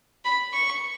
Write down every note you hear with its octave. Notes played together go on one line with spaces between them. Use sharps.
B5
C#6